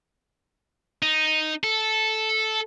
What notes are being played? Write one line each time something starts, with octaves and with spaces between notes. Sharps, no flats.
D#4
A4